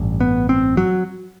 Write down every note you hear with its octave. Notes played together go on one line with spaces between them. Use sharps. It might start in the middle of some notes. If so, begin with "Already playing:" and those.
Already playing: A1 G2
B3
C4
F#3